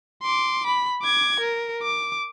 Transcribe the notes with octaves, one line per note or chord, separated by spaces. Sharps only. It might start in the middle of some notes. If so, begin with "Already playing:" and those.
C6 D6
B5
D6 G#6
A#4
D6